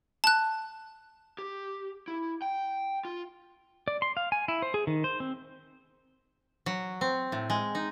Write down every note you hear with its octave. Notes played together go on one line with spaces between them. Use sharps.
A5 F#6
G4
E4
G5
F4
D5
C6
F5
G#5
E4
C5
G#4
D#3
C5
C4
F#3
C4
A2
G#3
D#4